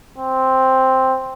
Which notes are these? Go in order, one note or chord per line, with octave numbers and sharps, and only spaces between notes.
C4